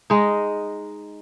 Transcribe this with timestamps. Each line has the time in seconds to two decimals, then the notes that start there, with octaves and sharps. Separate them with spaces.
0.10 G#3 D#4